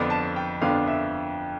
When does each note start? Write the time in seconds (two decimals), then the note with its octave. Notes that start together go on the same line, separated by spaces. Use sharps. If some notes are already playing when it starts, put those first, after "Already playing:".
Already playing: F2 D3 F3 B3 D4 B5
0.10 A5
0.36 G5
0.61 F2 D3 F3 B3 D4 F5
0.87 E5